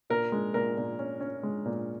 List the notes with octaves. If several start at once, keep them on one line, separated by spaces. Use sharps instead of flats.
A#2 A#4
G#3
A#2 A#4
A#2
C#4
C#4
G#3
A#2